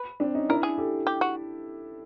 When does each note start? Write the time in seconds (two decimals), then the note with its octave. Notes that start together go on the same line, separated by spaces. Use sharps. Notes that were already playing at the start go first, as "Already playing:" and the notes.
Already playing: B4
0.20 C4 D4
0.35 C#4 D#4
0.49 D4 E4 A#4
0.63 G#4
0.78 G4 A4
1.07 G4
1.21 F#4